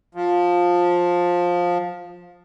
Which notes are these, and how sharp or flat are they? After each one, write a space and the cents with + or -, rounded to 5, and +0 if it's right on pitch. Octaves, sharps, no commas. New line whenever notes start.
F3 +15